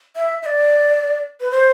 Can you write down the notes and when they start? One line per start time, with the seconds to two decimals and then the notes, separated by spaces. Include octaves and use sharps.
0.16 E5
0.43 E5
0.46 D5
1.41 B4
1.51 C5